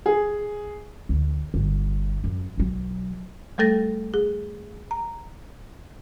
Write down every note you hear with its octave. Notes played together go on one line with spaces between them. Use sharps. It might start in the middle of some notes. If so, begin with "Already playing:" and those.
G#4
D2
G1 G3
F#2
B1 F#3
G3 A3 A4 A6 A#6
G#4
A#5